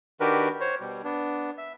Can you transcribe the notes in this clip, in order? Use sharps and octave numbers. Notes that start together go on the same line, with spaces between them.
D#3 D4 F#4 G4 A#4 B4
C5 C#5
B2 G3
B3 D4
E5